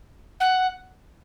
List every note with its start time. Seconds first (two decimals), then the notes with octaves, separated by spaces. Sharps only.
0.40 F#5